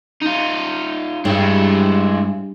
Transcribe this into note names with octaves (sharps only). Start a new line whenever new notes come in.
D#4 F4
G2 G#3 E4